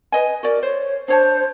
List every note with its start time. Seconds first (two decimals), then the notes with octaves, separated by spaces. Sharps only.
0.12 B4 D#5 G#5
0.43 F#4 A#4 D5
0.63 C5 C#5
1.08 D4 C5 C#5 A5